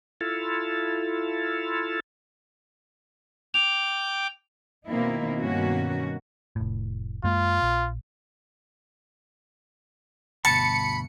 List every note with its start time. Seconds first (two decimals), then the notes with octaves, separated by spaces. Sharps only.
0.21 E4 F4 A4
3.54 G5 D6 F7
4.87 B2 D#3 A#3 C4 D#4 E4
5.39 G2 B2 D#3 A#3 C#4 F#4
6.56 F1 A2
7.24 F#2 G#3 A#3 F4
7.62 A#1
10.45 D2 G2 B2 A5 B5 C#7